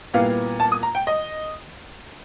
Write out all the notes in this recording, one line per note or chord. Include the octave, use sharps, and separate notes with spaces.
A#2 G3 B3 E4 F5
A5
D#6
A#5
G5
D#5